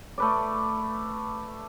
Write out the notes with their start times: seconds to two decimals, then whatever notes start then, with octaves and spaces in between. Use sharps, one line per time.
0.18 A3 B4 D5